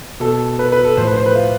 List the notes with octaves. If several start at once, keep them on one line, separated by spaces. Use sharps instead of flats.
B2 A4
B4
B4
A4
A2 F3 C5
B4
C5
B4
F4